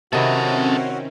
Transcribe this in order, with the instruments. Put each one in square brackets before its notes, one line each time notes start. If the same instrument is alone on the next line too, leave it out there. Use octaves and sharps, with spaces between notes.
[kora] C3 D#3 E4 [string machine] C4 C#4 [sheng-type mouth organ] F#4 [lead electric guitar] A4 D#5